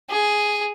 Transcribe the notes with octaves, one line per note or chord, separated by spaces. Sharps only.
G#4